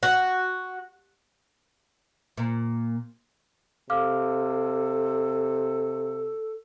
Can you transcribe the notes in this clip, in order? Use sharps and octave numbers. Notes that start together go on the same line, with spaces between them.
F#4
A#2
C3 A4 F5 D6 F6